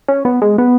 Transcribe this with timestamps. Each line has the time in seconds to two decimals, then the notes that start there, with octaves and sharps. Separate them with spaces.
0.08 C#4
0.25 B3
0.42 G#3
0.58 B3